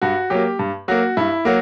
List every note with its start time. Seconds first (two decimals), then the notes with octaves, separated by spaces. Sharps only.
0.02 G2 F#4
0.30 F#3 A#3 G4
0.59 G2
0.88 F#3 A#3 F#4
1.17 G2 E4
1.45 F#3 A#3 F#4